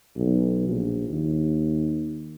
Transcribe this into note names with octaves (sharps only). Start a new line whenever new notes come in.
B1
A#1
D#2